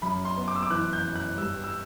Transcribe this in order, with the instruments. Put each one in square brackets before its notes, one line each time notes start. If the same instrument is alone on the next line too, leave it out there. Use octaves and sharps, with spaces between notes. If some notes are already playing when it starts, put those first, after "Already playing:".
[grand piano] F#2 B5
C6
B3
D6
E6
D6
E3 F#6
G6
F#2
F#6
G2 E6
E6